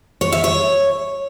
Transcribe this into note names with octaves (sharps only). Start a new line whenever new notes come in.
C#5
E5
C#5